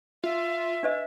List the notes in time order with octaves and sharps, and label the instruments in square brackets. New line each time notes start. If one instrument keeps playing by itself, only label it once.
[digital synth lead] F4 [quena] E5
[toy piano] D4 B4 D#5